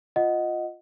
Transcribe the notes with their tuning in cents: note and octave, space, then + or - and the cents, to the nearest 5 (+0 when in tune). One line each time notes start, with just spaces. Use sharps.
F4 +0 D#5 +0 F#5 +0